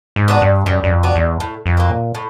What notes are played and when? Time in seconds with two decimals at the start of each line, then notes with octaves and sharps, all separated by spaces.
0.16 G#2
0.28 B3 D4 F#4
0.42 G2
0.66 F#2 G3
0.84 F#2
0.91 F2
1.03 B3 D4 F#4
1.16 E2
1.40 A2
1.66 F2
1.77 F#3 A#3
1.90 A#2
2.15 A2